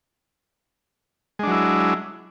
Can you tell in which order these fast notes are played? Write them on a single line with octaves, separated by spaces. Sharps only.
G#3 D4 F#3 E4